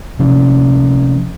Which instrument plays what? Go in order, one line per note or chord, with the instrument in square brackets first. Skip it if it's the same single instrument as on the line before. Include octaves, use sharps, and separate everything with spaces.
[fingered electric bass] C3 F3 C#4